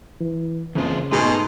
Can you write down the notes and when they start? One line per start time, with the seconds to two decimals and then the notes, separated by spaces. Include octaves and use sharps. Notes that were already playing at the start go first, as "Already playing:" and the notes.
0.20 E3
0.75 F#1 F2 C#3 E3 F4
1.12 G#2 B2 G#3 A3 D#4 G#4 D#5 C6